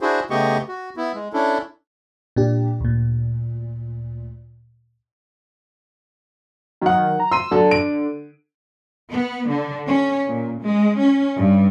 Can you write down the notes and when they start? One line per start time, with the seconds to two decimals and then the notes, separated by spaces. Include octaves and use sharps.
0.01 D4 E4 F#4 G#4 C5
0.30 C#3 A3 B3 G4 D#5 C#6
0.68 F#4
0.97 B3 E4
1.15 G#3
1.33 C#4 D4 E4 A4
2.36 A#2 D4 G4
2.80 D2 A#2
6.82 D#3 F#3 F#5
7.20 A#5
7.32 C6 E6 D#7
7.51 D3 F#3 A4
7.71 D7
9.11 B3
9.48 D3
9.87 C#4
10.29 A#2
10.62 G#3
10.99 C#4
11.38 G2